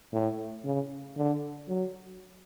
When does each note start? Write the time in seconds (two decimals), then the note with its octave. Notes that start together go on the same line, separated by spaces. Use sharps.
0.13 A2
0.65 C#3
1.17 D3
1.68 F#3